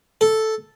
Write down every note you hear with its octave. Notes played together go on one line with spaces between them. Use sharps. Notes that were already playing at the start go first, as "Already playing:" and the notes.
A4